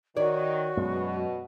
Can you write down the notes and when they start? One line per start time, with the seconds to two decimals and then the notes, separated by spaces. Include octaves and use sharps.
0.16 D#3 F#4 C#5 D5
0.77 F#2 B2 G#3